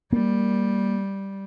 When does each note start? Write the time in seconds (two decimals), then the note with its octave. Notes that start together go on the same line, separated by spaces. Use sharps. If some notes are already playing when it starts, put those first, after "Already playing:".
0.12 G3 A#3